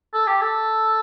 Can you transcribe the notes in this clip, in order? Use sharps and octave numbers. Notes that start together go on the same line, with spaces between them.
A4
G4
A4